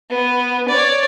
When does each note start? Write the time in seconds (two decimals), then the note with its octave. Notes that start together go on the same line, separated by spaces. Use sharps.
0.11 B3
0.69 C#5 D5